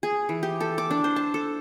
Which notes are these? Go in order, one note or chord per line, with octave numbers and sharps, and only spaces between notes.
G#4
E3
G4
A4
D6
D4
C5
A5
A4